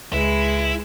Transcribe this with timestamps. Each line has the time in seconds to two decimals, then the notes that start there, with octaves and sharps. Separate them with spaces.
0.13 C#2 G#3 E4 B4